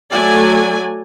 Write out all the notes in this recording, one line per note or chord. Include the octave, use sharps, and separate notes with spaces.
F#3 A3 D5 G#5